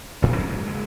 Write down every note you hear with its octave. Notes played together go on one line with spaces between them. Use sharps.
A1 A2 F#3 G3
F2 D#3 F#3 C#4
G#2 F#3
F#1 G#3